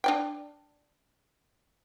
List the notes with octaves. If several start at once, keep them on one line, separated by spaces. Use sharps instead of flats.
D4 D5 G5